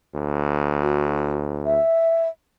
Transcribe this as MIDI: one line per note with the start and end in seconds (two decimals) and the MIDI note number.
0.15 1.78 38
0.82 1.36 66
1.65 2.28 76